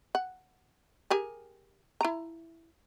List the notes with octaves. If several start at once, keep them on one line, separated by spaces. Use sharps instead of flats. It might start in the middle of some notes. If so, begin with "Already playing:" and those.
F#5
G4 G#4 A#4
E4 A#5